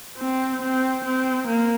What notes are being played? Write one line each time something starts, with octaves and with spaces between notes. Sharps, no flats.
C4
C4
C4
A#3